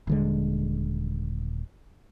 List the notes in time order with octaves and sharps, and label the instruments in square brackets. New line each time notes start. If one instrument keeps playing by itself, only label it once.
[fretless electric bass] D#1 D3 G#3